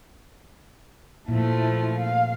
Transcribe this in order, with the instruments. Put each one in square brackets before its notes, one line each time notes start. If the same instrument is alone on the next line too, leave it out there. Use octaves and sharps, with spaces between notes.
[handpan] A#2 [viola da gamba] F3 A3 [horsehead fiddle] E4 A5
[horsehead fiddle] F5